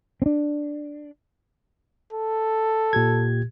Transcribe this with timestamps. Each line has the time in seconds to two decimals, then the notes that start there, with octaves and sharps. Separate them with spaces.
0.22 C4 D4
2.13 A4
2.93 A#2 G4 G#6